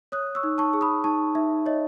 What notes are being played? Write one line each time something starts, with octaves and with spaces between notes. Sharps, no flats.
C#5 D#6 F#6
C#6 E6
D#4
A5 C#6
G#4
B5 D#6
D#4 A5 C#6
D#4 E5
C#5 D#5